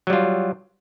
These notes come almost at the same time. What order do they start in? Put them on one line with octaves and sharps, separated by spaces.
F#3 G3 F4